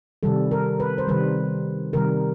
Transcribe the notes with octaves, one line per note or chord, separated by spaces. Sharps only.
C3 D#3 G3 A4
A#4
B4
C5
C3 D#3 G3 B4
C3 D#3 G3 A#4